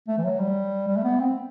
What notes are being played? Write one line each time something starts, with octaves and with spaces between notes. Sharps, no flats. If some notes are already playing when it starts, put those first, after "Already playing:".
A3
E3
F#3
G3
G3
A3
B3
C4